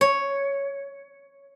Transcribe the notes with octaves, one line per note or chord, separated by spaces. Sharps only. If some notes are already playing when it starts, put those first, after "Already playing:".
C#5